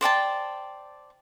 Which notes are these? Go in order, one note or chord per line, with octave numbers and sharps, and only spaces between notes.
C5 D5 G5 A5